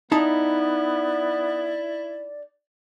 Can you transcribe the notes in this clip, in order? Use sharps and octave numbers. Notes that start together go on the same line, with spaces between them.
B3 D#4 E4 D5 A5